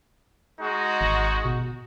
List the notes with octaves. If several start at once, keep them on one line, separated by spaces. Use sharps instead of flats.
G#3 D#4 F#4
G#1
B2